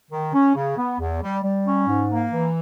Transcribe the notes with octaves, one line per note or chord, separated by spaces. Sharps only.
D#3
C#4
C#3
B3
E2
G3
G3
C#4
G#2
A#3
E3